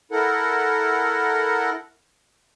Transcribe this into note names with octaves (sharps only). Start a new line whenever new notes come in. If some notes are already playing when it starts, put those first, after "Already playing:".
E4 A4 A#4 F#5